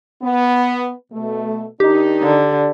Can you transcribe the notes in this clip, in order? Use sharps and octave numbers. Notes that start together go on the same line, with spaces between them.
B3
B2 A3
D#3 D4 D#4 G4
D3